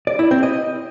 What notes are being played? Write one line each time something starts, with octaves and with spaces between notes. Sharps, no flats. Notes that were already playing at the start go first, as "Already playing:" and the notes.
D5
E4
C4
D#5